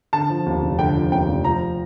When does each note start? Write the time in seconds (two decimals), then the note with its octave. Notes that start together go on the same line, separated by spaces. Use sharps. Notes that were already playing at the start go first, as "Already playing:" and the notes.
0.13 D3 A5
0.29 F3
0.46 D#2
0.63 F1
0.79 D3 G5
0.95 F3
1.12 D#2 G5
1.28 F1
1.44 F3 A#5